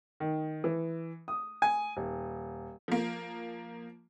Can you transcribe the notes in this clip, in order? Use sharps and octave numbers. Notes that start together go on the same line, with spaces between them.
D#3
E3
D#6
G#5
D#1
F3 A#3